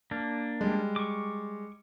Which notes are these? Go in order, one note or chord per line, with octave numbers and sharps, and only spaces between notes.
A#3 D4
G3 G#3
C#6 D6